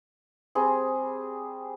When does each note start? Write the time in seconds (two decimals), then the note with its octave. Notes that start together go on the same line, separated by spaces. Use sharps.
0.55 G3 C4 G#4